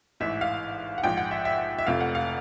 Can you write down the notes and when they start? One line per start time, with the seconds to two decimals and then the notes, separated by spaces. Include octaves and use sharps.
0.20 A1 G#2 E3 E5
0.41 F5
0.98 F#5
1.03 A#1 G#2 F3 G5
1.17 F#5
1.31 E5
1.45 E5
1.79 E5
1.87 F1 F2 C3 F3 A3 F5
2.01 F#5
2.15 F5